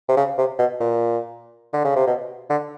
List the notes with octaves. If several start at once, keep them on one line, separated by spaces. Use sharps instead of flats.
C3
C#3
C3
B2
A#2
D3
C#3
C3
B2
D3